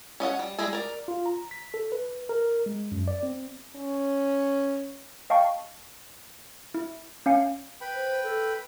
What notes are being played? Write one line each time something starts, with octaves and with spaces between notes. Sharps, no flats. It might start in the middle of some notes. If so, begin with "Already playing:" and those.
C#4 D#5 F5 F#5
G3
G3 G#3 E4 G#4
A#4 D5
F4
A#5
B6
A4
B4
A#4
G#3
F#2
D5
C4
C#4
D#5 F5 G5 A5 C#6
E4
C#4 F5 G#5 C#7
B4 G5 B5
C5
A4